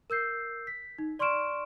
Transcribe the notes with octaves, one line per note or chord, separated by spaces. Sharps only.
A#4 E6 G6 C7
B6
D#4
D5 C6 C#6 F6 D7 E7